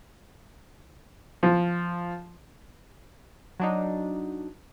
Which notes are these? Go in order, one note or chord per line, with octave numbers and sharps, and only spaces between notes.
F3
F#3 D4 D#4